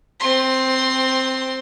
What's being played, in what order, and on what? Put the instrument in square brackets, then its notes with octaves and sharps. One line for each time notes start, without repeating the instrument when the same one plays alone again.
[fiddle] C4 C6